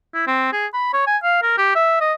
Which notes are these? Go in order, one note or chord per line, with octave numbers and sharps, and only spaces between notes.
E4
C4
G#4
B5
C#5
G#5
F5
A#4
G4
E5
D#5